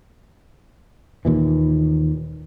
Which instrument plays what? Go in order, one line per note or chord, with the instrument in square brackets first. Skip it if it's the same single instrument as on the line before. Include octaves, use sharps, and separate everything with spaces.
[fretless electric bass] D#2 A#2 E3